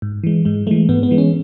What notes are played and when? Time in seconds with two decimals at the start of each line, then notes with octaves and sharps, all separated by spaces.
0.02 G#2
0.24 E3 G#3
0.45 G#2 G#3
0.67 E3 G#3 A3
0.89 G#2 B3
1.03 B3
1.11 E3 G#3
1.18 C#4